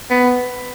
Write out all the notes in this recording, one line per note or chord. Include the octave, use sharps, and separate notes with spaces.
B3